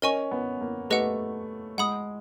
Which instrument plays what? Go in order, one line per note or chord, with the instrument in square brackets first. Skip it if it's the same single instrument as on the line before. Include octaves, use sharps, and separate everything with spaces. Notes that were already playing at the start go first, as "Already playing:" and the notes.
[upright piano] C#4 [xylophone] A#4 D#5 G#5 C#6
[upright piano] B3
A#3
[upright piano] A3 [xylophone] G4 B4 D#5 F#5
[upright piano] G#3 [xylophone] F#5 B5 D#6